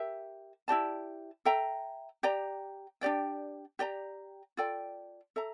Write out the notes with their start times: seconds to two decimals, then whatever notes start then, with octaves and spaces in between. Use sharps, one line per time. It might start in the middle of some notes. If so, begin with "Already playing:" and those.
Already playing: G4 A#4 E5
0.68 E4 G4 D5 A5
1.45 A4 E5 G5 A#5
2.23 G4 D5 G5 A#5
3.01 D4 G4 D5 G5
3.79 G4 D5 G5 A#5
4.57 F4 A4 D5 G5
5.36 A4 E5 A#5